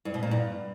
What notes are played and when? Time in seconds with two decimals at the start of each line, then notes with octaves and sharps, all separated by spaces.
0.05 G2
0.14 B2
0.23 A#2
0.31 G2